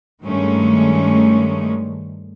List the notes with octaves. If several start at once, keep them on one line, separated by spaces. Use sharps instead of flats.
G2 D#3 G#3 A3 C#4